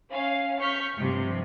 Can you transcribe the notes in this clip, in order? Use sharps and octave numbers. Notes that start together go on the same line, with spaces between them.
C#4 F5
C#6 F6 G6 B6
G2 C3 F3